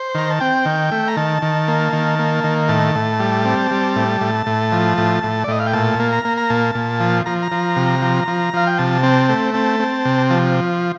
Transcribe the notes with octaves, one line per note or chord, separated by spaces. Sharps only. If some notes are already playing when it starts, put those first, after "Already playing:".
Already playing: C5
D#3 A#5
A5
C4 G5
D#3
A3
A#5
D#3 A5
D#3
A#3
D#3
A#3
D#3
A2 A5
A2
G3
C4
G3
A2
A2
A2
F3
A2
A2
D5
A2 D#5
F5
G5
A#2 A5
A#3
A#5
A#3
A#5
A#2 A5
A#2
F3
F3 A#5
A#5
F3
C3
F3
F3
F3 F5
G5
C3 A5
C4
A3
C4 A5
C4
C3
F3 A5